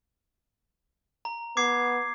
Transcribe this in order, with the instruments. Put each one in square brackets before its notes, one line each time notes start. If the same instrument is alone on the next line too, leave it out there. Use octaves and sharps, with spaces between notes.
[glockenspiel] A#5
[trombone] B3 [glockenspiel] D6 G#6 C7